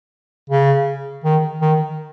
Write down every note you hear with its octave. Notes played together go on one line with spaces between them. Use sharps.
C#3
D#3
D#3